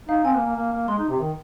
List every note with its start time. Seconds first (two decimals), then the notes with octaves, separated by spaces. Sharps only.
0.08 D#4 F5
0.24 C4 G#5
0.35 A#3
0.46 A#3
0.56 A#3
0.73 A#3
0.88 G#3 C6
0.99 D#4
1.09 C3
1.20 D#3